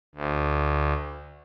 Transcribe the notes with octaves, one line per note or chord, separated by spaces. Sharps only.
D2